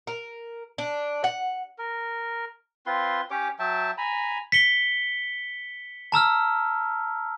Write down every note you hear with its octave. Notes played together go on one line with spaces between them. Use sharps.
A#4
D4
F#5
A#4
C4 F4 B4 C6
C#4 G4 C#5 D6
F#3 E5 G5 A5
G#5 A#5 B5
B6 C#7 G7
A5 A#5 E6 F6